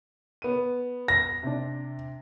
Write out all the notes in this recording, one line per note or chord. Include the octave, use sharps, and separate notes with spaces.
B3 D#7
A#6
C3 D4